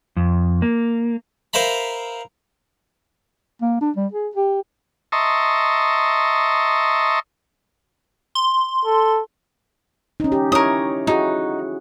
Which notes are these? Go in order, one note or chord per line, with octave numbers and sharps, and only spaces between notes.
F2
A#3
A#4 C5 E5 F5 A#5 B5
A#3
D4
G3
G#4
G4
D#5 E5 A5 A#5 C6 C#6
C6
A4
C#4 D#4
G4
E4 A#4 C#5 D#6
D#4 E4 F#4 G#4